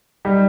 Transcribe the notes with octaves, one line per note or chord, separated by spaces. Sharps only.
G3 D#4 G4